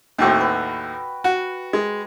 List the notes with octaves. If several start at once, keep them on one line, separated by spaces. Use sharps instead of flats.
D#2 A2 C4 F#4 G5
B4
F#4
G#3